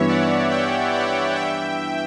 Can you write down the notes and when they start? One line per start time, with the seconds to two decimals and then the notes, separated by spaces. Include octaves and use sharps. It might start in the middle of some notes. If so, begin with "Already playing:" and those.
Already playing: G2 E3 B3 C#5 E5
0.09 D5 F#5
0.51 E5 G5
0.94 D5 F#5
1.36 E5 G5